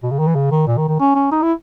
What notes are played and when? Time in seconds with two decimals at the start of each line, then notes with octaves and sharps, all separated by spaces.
0.03 B2
0.11 C#3
0.19 D#3
0.27 E3
0.35 C#3
0.51 D#3
0.67 A#2
0.78 D#3
0.88 D#3
1.00 C#4
1.15 C#4
1.31 D#4
1.42 E4